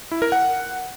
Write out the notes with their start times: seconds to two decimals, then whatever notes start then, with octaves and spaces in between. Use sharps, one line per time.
0.11 E4
0.22 A#4
0.32 F#5